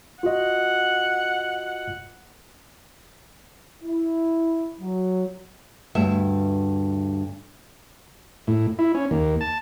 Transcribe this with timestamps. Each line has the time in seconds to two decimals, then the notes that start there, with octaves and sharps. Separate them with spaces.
0.23 F4 F#4 D#5 F#5
3.82 E4
4.79 F#3
5.95 D2 G2 E5
8.47 A2
8.79 E4
8.95 C#4
9.11 D#2
9.41 A5